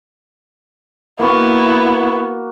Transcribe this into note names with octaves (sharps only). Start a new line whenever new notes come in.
A#3 B3 E4 F#4